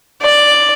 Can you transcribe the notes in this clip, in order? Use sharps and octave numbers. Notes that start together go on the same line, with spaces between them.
D5